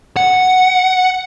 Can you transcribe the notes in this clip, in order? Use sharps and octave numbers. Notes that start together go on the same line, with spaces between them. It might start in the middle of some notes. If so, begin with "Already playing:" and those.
F#5